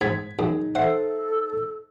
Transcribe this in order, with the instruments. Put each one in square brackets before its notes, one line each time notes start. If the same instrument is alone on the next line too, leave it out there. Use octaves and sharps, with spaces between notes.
[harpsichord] G#2 [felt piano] G#6 B6
[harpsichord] F#2 [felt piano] D#4 [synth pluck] G#4
[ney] A4 [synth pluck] C5 E5 C7 [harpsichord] F#5